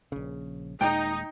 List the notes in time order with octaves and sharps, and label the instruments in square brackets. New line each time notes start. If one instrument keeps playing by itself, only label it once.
[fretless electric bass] A#1 C#3
[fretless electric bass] D#1 A#2 G#3 [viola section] D#4 [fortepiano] G5